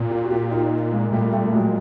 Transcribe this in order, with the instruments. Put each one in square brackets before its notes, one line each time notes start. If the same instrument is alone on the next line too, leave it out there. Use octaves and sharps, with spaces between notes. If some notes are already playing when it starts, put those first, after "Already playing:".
Already playing: [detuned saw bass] A#2
[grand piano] F4 G4
F#4
F4 G4
D#4 F4
G#3 A#3
[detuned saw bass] A#2 [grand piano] G3 A3
[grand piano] G3 A3
F#3 G#3